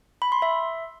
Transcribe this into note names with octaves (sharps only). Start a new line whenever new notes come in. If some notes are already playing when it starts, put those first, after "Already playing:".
B5
C6
E5